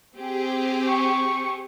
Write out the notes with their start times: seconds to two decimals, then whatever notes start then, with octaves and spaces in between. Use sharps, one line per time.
0.17 C4 G4 G#4
0.87 C#6